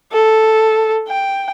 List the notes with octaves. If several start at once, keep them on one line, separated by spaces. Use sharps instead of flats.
A4
G5